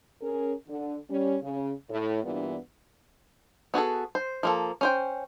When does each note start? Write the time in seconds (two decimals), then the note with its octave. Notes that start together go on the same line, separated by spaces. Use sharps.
0.22 C#4 G#4 A#4
0.68 D3
1.10 G3 C#4
1.42 C#3
1.90 A2
2.23 E2 G2 A#2 E3 B3 D4
3.74 B3 F#4 G#4 A4
4.15 C5
4.43 F3 A#3 A4
4.81 C#4 C5 G5